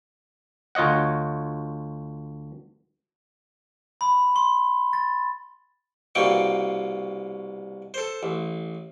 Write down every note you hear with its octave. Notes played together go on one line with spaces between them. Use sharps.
D2 F4 C#5 D#5 F#5
B5
C6
A6
C2 B2 A#3 G5 C#6
A4 C5
A1